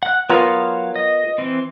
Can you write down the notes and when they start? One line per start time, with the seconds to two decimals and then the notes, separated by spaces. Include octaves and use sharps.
0.03 F#5 F#6
0.30 F#3 B3 F4 A#4 C#5 F5
0.96 D#5
1.38 E3 C4